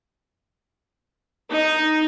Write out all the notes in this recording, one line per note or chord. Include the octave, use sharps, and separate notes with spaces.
D#4